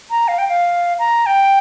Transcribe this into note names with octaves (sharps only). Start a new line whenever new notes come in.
A#5
F5
G5
F5
A#5
G5